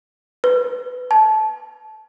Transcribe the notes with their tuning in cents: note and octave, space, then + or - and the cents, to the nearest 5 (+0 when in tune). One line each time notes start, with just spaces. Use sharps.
B4 +15
A5 -20